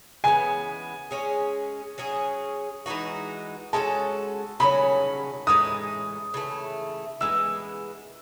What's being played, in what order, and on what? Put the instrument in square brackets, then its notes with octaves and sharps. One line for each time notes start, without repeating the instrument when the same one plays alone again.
[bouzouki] C#3 E3 G#3 B3 [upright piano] G#5
[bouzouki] G#3 C#4 G#4
F#3 C#4 G#4
E3 G#3 D#4 F#4
[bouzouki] G#3 C#4 F#4 A4 [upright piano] A5
[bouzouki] C#3 F#3 A3 C#4 [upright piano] B5
[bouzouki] A2 E3 G#3 D#4 [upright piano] D#6
[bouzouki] C#3 E3 A3
[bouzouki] E3 G#3 B3 [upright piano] E6